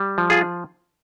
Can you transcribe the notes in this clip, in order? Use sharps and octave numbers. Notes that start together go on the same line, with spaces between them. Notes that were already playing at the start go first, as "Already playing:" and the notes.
Already playing: G3
F3
F4 G#4